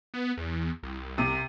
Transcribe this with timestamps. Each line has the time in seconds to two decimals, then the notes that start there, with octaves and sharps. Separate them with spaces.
0.14 B3
0.37 E2
0.83 C2
1.18 C3